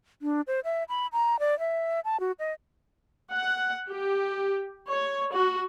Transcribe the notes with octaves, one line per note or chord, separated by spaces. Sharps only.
D4
C5
E5
B5
A#5
D5
E5
A5
F#4
D#5
F#5
G4
C#5
F#4